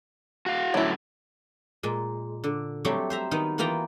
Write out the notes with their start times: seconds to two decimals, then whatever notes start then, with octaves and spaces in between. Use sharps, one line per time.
0.46 F#4 F5
0.74 F#2 A2 D3 F#3 E4
1.83 A#2 G#3
2.44 D3
2.85 F#3 G3 A3 C4 C#5
3.10 C5 E5 A#5
3.31 D#3 B3 D#4
3.58 E3 A#3 B3 F4 G5 A#5